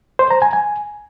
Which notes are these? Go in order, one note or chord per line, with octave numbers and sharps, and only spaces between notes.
C5
A#5
G#5
G#5